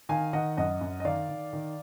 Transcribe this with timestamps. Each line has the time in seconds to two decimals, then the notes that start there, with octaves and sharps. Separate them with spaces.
0.09 D#3 F5 G#5
0.33 D#3 D#5 F#5
0.57 F#2 D#5 F#5
0.81 F#2
1.00 D#5
1.05 D#3 D5 F5
1.29 D#3
1.53 D#3